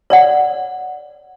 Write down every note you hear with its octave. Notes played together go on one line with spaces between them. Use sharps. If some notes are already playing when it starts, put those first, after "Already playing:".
C#5 D5 F#5